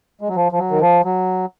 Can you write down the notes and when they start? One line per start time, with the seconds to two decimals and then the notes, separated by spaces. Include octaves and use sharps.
0.21 G#3
0.29 F#3
0.36 F3
0.52 F3
0.58 F#3
0.71 D#3
0.81 F3
1.05 F#3